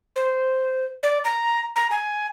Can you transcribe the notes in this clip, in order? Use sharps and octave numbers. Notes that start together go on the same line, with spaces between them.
C5
D5
A#5
A#5
G#5